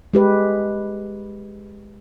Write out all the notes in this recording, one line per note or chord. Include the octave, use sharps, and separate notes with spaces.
G#3 G4 B4